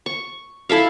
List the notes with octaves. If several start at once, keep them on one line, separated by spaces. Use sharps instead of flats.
C#6
E4 A4 E5 F5